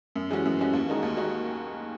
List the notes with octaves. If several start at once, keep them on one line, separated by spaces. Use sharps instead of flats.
F#2
E3 G#3 C#4 F#4
F#2
E3 G#3 C#4 F#4
D#2
D#3 G#3 D#4 F#4
D#2
D#3 G#3 D#4 F#4